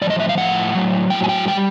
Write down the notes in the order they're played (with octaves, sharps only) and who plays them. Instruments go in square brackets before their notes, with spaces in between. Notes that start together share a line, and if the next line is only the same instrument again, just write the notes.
[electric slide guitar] A2 F3 D5
D#5
E5
F5
A2 F3 F#5
A2 F#3
A2 F#3 G5
G#5
G5
E3 G3 G5